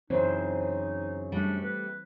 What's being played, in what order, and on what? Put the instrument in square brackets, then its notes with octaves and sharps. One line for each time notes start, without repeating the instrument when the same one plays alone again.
[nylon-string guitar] F#2 C#3 [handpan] E3 C4 C5 [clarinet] D#4
[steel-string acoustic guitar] G3 A3 [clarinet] D4
[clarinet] B4